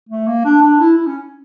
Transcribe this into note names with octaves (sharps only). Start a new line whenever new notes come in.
A3
A#3
D4
D4
E4
E4
C#4